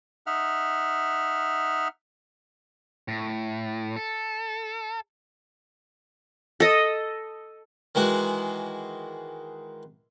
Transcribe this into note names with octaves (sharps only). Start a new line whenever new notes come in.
D#4 E5 F#5 F6
A2
A4
A4 D#5
D#3 E3 G#3 F#4